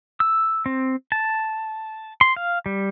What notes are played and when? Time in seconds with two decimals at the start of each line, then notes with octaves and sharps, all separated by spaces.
0.20 E6
0.66 C4
1.12 A5
2.21 C6
2.36 F5
2.66 G3